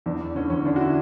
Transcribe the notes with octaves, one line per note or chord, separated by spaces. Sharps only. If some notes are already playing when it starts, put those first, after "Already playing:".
E2 D4
E2
D3 C#4
E2 C#4
D3 D4
F#4
E4